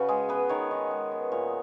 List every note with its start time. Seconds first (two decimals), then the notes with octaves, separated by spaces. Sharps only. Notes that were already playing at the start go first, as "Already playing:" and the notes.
Already playing: C#3 F#4 B4
0.08 G#3 G#4
0.29 B3 B4
0.49 D#3 C#5
0.71 D#3
0.91 G#3
1.11 B3
1.32 A#2 C#5